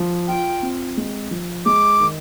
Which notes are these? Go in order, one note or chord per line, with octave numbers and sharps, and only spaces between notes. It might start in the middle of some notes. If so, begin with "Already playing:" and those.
Already playing: F3
F4 G5
C4
G#3
F3
G#3 D6
D#3